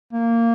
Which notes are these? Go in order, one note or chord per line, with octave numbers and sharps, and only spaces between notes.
A#3